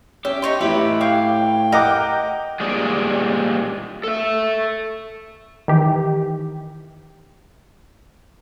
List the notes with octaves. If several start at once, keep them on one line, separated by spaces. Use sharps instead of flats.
C#4 G4 E5
D#4 C#5 C6
A2 E4 G4 B4
C#5 F5 G5 D6
A#4 D#5 F#5 D6
A#2 G3 G#3
A4 E5
D#3 E3 G4